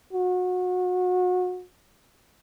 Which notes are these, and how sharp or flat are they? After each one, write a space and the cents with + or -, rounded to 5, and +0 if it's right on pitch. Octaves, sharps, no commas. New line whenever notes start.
F#4 -30